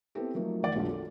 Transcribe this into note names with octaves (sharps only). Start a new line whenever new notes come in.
B3 C4 E4 G4 A4
F3 F#3 A3 A#3 D#4
F1 D#3 D#4 D5 F#5
B1 F#2 G#3 D4 F4
F#4 A4